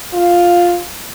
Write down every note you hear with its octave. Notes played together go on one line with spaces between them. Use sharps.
F4